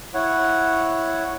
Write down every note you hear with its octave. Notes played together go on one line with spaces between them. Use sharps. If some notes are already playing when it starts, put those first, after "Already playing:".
E4 C#5 F#5